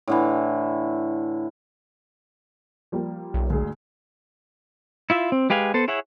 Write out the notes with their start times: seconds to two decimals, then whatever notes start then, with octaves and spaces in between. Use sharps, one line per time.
0.07 A2 D3 E3
2.92 F3 G3 A#3
3.34 B1
3.50 D2 G#2 G#4
5.10 E4 F4 E5
5.32 C4
5.50 G#3 G4 B4 F5 G#5
5.74 B3 A4 C5
5.88 E4 G#4 C#5 E5 F#5